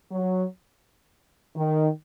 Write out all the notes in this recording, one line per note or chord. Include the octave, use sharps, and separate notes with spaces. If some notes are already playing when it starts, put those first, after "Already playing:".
F#3
D#3